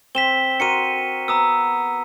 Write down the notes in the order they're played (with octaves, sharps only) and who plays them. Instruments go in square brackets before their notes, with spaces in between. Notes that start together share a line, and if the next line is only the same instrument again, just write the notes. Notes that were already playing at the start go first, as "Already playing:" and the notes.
[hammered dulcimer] C4 [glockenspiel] B6 E7 G7
[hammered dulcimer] F#4 A#4 C6 [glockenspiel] C#7 D#7
[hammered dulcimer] B3 [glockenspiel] A#5 D#6 E6